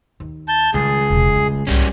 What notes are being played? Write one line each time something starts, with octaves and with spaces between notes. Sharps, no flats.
D#2
A5 G6
C#2 D#3 G3 G#4
E1 C3
G3 A3
C2 G#2 G3 C#4